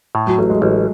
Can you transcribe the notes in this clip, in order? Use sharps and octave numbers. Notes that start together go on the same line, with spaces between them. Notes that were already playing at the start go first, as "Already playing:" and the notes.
A2
F#3
A1 A3
G#3
A1